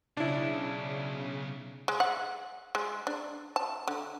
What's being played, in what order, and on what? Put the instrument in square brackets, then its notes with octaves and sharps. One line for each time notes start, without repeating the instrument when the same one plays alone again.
[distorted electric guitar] B1 [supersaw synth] C#3 [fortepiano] D4 E4
[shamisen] G#3
F#5
G#3
D4
A5
D3